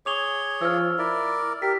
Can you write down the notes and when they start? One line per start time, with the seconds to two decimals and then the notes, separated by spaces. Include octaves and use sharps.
0.06 G#4 C#5 D6 F7 G7
0.61 F3 E6 F6
0.99 E4 A#4 D5
1.62 G4 A#4 B6